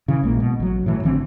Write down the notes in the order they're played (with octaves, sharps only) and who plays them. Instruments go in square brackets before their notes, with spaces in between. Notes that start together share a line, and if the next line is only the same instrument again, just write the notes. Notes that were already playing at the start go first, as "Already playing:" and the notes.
[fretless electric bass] C#3 E3
A#1 G#3 A#3
B2
A1 F#3
A2 E3 F#3
A1 D3 E3 C4